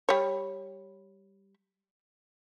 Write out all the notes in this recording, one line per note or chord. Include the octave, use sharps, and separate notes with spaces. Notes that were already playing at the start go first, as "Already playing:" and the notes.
G3 C#5